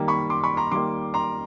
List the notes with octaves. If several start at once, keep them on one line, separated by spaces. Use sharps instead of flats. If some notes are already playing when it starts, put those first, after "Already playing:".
Already playing: D#3 G3 A#3
B5 C#6
C6 D6
B5 C#6
A#5 C6
D#3 G3 A#3 C6 D6
A#5 C6